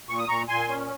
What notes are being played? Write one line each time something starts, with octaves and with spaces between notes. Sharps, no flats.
A#2 C#6
D#6
A#2 A#5 C#6
A#2 G#5 C6
C#4